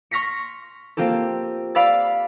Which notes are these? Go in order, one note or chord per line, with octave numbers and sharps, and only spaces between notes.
C6 C#6 F6 A#6 B6 C#7
A#3 C4 F4 G4 A4
D5 F5 B5 E6 A6